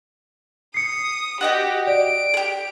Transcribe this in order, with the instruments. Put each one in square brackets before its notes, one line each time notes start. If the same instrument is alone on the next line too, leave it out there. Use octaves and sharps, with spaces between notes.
[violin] D#6 [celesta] C7 C#7
[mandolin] F#4 D#5 G5 [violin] G4
[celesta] D5 [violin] D7
[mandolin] G4 G#4